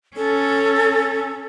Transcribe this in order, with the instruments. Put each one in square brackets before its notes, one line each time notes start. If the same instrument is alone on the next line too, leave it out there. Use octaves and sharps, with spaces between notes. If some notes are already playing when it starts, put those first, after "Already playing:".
[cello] C#4 [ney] A4